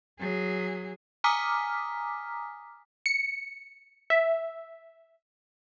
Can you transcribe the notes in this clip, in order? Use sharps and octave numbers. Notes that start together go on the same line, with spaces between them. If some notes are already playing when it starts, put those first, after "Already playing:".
F#3 G#4
G#5 A#5 D6 D#6 F6 B6
C#7
E5